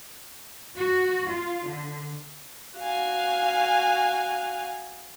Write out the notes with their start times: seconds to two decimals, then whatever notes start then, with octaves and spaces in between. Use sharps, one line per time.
0.76 F#4
1.27 F4
1.64 D3
2.77 F#4 F5 G#5